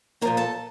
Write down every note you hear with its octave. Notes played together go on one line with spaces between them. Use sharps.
A#2 F3 A#3 A#4 A#5
A4 A5